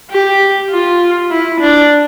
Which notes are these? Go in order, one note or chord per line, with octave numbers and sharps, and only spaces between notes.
G4
F4
E4
D4